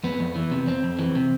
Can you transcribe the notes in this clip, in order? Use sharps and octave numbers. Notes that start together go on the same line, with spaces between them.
F2 B3
F2
E3
C3
F2 C4
F2
E3
C3